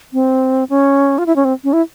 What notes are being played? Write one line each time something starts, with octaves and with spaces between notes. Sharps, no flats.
C4
C#4
F4
E4
C#4
C4
C#4
E4